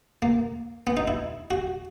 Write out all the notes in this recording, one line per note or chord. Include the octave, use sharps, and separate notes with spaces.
A#3
B3
D#4
E4
F#4